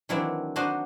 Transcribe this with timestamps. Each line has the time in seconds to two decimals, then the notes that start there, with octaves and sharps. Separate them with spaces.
0.09 D#3 E3 F#3 C4 D4 E4
0.56 D4 D#4 F#4 C5 D#5